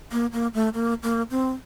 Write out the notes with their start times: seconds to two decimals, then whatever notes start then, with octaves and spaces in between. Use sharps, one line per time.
0.12 A#3
0.33 A#3
0.54 A3
0.74 A#3
1.03 A#3
1.31 C4